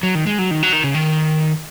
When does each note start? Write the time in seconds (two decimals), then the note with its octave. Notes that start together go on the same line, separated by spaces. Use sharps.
0.03 F#3
0.15 D#3
0.27 G#3
0.39 F#3
0.51 D#3
0.63 F#3
0.73 D#3
0.84 C#3
0.94 D#3